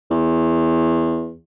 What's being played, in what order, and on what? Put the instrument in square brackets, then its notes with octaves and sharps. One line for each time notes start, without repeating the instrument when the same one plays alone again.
[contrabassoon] E2